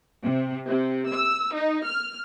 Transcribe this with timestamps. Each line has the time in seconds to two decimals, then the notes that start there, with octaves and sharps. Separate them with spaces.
0.24 C3
0.69 C3
1.11 E6
1.55 D#4
1.86 F6